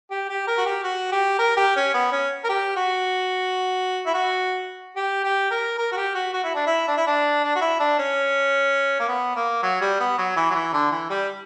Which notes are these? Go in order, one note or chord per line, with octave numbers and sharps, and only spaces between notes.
G4
G4
A#4
F#4
G4
F#4
G4
A#4
G4
C#4
B3
C#4
A#4
G4
F#4
E4
F#4
G4
G4
A#4
A#4
F#4
G4
F#4
F#4
E4
D4
E4
D4
E4
D4
D4
F#4
E4
D4
C#4
A#3
B3
A#3
F#3
G3
B3
F#3
E3
F#3
E3
D3
E3
G3